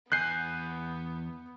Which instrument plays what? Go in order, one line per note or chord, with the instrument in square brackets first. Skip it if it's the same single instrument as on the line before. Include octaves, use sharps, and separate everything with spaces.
[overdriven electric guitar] E2 G#5 [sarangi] B3 [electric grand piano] F#6 G6 C7